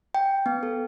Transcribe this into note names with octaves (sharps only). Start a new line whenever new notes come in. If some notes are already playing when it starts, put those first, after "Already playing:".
G5
B3
A4